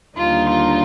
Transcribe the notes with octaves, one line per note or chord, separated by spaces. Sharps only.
D#2 D3 G3 A#3 D#4 F4
F4